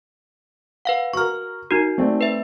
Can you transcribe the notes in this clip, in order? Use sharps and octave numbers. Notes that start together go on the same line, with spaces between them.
B4 F5 F#5
F#4 A#4 C#6 F6
D#4 F#4 A#4
A3 C4 D5
B4 E5